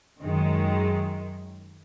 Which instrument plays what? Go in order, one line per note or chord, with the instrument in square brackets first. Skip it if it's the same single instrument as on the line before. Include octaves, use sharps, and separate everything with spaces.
[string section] F#2 D#3 G#3